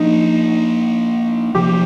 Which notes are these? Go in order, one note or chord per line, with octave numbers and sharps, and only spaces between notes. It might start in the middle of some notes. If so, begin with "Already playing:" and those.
Already playing: F3 A#3 D4 D#4
C3 F3 A#3 G4